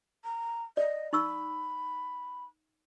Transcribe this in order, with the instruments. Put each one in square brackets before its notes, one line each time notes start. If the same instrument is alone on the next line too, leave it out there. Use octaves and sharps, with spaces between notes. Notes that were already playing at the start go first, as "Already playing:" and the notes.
[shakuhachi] A#5
[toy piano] D5 [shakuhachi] D#5
[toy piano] D#4 C#6 E6 [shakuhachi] B5